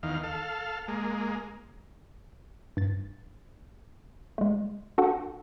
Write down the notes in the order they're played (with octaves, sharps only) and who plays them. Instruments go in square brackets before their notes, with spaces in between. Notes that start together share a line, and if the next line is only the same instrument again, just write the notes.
[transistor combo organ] E2 D#3 F5
A4 F5
G#3 A#3
[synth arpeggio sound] G2 A6
G#3 A3
D4 F#4 A4 F#5 G5